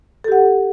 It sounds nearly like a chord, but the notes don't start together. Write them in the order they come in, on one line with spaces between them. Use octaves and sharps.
A4 G4 F#5